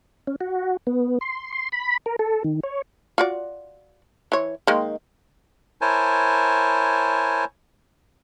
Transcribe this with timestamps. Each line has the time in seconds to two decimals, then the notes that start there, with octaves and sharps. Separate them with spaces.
0.27 C#4
0.41 F#4
0.87 B3
1.21 C6
1.52 C6
1.72 B5
2.06 A#4
2.19 A4
2.44 D#3
2.63 C#5
3.18 F4 F#4 D5
4.32 E3 C#5
4.67 D#3 G#3 A#3
5.81 E4 A#4 C5 C#5 G#5 A5